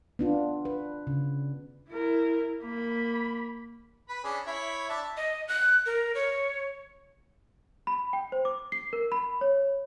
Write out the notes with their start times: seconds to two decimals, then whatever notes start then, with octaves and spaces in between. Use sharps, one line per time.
0.19 B3 D4 F4
0.65 B4
1.07 C#3
1.90 E4 A#4
2.64 A#3 B5
4.09 B4 B5
4.24 C#4 D4 G#4
4.47 E4 C#5 B5
4.90 D4 E5 A5
5.17 D#5
5.48 F#6
5.86 A#4
6.15 C#5
7.87 B5
8.13 G5
8.32 C5
8.45 D6
8.72 C7
8.93 A#4
9.12 B5
9.41 C#5